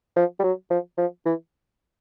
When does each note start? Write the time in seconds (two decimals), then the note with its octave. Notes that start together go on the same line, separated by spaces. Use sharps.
0.16 F3
0.39 G3
0.44 F#3
0.70 F3
0.97 F3
1.25 E3